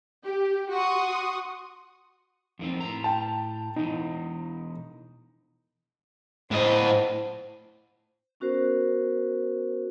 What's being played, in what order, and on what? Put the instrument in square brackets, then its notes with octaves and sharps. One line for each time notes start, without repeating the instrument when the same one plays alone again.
[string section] G4
F#4 F#5 C6 C#6 D#6
[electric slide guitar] F2 D#3 C4
A2 A#5
[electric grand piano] G5 A5
[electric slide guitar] B2 E3 [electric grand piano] D#4
[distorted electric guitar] A2 D#5 [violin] C5
[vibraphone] B3 C#4 F#4 A#4 C5